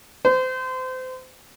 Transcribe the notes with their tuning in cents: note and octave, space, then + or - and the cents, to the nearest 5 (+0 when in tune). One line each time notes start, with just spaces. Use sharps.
C5 -30